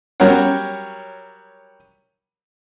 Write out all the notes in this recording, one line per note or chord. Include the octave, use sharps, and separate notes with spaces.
F#3 G3 A#4 C#5 F#5